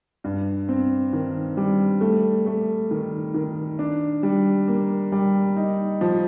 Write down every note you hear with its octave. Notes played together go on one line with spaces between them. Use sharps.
G2
C4
D#3
G3
A3
A3
D#3
D#3
D4
G3
A#3
G3
D#4
F3